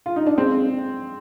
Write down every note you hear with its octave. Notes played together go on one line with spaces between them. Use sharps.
F4
D#4
D4
G#3 C4